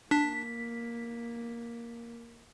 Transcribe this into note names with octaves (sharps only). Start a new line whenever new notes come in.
A#3 D4 B6